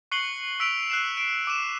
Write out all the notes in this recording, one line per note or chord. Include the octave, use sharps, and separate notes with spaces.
C#6 F#6 C7 C#7 F#7 G7
E6 B6 D7 F7
F#6 C7 E7
D7
D6 D#7 E7